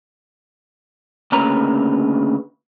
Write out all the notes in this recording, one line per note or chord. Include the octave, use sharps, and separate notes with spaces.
D2 C#3 A#3 B4 C#5 A#5